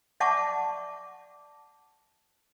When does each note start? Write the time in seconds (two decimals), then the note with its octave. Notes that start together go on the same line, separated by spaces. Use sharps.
0.20 D5 E5 F#5 A5 C#6 D6